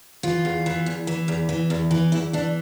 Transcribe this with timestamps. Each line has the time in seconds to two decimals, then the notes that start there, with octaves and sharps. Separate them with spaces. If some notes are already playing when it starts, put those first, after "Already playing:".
0.23 E3 F4
0.45 E2
0.66 E3
0.86 E2
1.07 E3
1.28 E2
1.49 E3
1.70 E2
1.91 E3
2.12 E2 E4
2.33 E3 D4